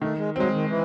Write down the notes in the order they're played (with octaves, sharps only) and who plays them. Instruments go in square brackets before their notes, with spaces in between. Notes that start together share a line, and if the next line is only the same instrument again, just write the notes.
[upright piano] D#3 [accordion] A3
[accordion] G#3
[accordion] F#3 [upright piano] G#3 C4
[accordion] D#3
E3